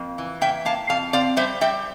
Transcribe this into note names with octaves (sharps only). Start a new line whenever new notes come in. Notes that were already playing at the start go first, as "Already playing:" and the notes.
Already playing: F2 A#3
E3
A#3 E5 G5
A#3 F5 A5
F2 F5 A5
C4 D5 F5
G3 C5 E5
G3 E5 G5